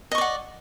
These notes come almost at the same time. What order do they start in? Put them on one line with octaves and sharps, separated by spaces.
D#5 C#6 D5 F#5